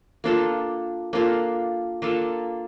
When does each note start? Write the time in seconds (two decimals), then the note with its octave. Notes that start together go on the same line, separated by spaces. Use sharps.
0.24 A#3 D4 F4 A4
1.13 A#3 D4 F4 A4
2.02 A#3 D4 F4 A4